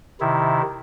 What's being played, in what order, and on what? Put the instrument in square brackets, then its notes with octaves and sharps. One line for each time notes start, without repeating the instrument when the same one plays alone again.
[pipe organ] C3 D#3 E4